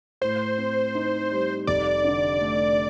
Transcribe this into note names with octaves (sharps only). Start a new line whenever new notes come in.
A2 C5
C4
D#4
G3
F1 D5
D3
A3